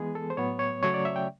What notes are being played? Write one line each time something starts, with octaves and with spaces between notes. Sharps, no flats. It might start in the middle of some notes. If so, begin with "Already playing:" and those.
Already playing: E3 G#3 B3 G#4
A4
C5
A2 F#3 B3 C#5
C#5
C#3 F#3 A3 C#4 C#5
D5
E5
G5